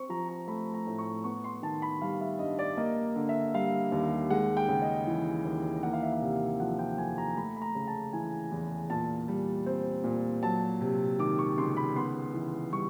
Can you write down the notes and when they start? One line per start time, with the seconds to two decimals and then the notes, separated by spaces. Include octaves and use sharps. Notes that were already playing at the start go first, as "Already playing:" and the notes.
Already playing: C4 C#6
0.09 F3 A#5
0.29 A#5
0.48 A3 B5
0.74 A#5
0.87 A2
0.98 C#6
1.24 B3 C#6
1.44 C6
1.62 D#3 A5
1.82 B5
2.01 G3 F5
2.21 E5
2.39 G2 D#5
2.59 D5
2.77 A#3 D#5
3.16 D3
3.29 E5
3.54 G3 F5
3.92 D#2
4.30 G#3 F#5
4.57 G5
4.68 C#3
4.82 D#5
5.07 E3
5.45 D#2
5.83 A#3 F#5
5.93 F5
6.02 E5
6.13 F5
6.21 C3
6.60 F3 F#5
6.79 G5
6.98 F2 G#5
7.18 A#5
7.36 A3 B5
7.56 B5
7.62 A#5
7.75 C#3
7.87 A5
8.13 E3 G#5
8.52 E2
8.90 A#2 A5
9.28 G3
9.66 C4
10.04 A#2
10.43 F#3 A5
10.81 C3
11.19 D#3 D6
11.39 C#6
11.57 C#2 C6
11.77 B5
11.96 B3 C6
12.33 E3
12.72 G3 C#6